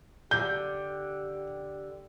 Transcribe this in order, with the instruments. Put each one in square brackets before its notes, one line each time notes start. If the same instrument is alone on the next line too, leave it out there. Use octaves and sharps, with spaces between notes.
[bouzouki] D3 [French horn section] G4 [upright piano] G6